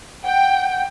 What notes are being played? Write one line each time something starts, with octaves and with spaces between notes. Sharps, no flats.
F#5 G5